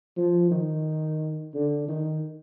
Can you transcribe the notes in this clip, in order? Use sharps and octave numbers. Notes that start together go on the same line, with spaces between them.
F3
D#3
D3
D#3